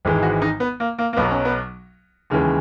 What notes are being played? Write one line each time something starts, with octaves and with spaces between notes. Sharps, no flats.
G#1 G#2 E3 G#3
F#4
D#4
B3
A#3
A#3
A#3
B1 B2 F#3 B3
C#4
B3
D#2 C#3 E3 G#3